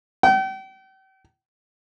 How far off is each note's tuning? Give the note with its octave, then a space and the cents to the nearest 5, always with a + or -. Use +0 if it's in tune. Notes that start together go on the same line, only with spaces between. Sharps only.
G5 -40